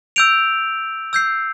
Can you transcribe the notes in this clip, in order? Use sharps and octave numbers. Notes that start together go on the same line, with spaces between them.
E6 G6 D7 F7
E6 G6 C7